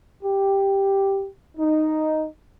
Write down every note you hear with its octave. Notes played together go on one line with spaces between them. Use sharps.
G4
D#4